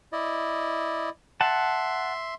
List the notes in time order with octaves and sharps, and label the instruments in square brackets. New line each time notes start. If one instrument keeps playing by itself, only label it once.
[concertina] E4 D5 D#5
[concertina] E5 C6 [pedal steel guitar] F#5 A5